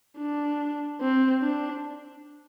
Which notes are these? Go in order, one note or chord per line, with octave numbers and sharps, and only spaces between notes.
D4
C4
D4